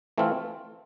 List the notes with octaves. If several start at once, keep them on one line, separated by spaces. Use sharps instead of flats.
E3 A3 C4 F4